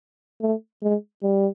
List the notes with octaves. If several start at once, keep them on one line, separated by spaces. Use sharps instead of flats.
A3
G#3
G3